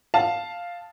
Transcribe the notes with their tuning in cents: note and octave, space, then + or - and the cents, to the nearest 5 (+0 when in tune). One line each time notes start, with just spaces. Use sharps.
F5 +0 A5 +0